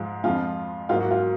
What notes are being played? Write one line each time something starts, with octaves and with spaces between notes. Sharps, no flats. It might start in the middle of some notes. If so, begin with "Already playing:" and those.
Already playing: G#2 F3 G#3 F4
F2 F3 G#3 F4
G#2 F#3 A#3 F4
F#4
F4